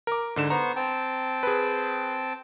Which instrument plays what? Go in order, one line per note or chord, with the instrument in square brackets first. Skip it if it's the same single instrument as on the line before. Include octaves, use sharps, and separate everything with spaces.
[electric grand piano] A#4 D6
G#2 D3 E7
[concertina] B3 C5 C#6 [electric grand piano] A#5
[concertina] C4 G5 A5
[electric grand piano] G#4 B4